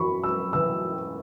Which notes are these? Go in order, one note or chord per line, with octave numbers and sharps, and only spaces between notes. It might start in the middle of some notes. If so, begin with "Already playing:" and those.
Already playing: F#2 E3 B5 C#6
E6
E3 E6